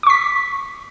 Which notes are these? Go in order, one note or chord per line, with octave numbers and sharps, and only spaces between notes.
C#6 D6 B6